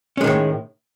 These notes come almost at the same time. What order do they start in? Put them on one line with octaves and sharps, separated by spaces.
C#4 G#3 D#3 A2